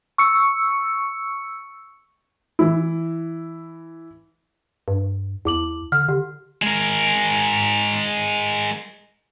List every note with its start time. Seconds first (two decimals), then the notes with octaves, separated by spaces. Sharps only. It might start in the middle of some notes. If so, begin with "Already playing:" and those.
0.18 C#6 E6 C#7
2.59 E3 E4
4.88 G2
5.45 E2 E4 D6 F#7
5.92 D3 F6
6.08 D3 G4
6.62 G#3 A#4